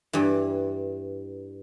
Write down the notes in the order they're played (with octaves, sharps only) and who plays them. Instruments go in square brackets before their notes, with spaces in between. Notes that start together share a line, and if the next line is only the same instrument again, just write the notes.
[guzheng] G2 E3